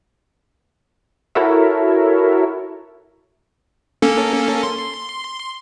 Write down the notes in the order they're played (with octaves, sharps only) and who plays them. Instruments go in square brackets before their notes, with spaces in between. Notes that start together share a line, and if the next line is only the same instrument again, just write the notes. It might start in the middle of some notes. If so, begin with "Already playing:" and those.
[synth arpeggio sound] E4 F#4 A4 A#4 C#5 E5
[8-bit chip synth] A#3 C#4 A4
C6